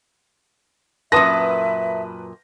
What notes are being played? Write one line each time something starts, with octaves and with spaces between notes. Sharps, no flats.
F#2 A#2 A#4 B4 E5 A5 D#6 A#6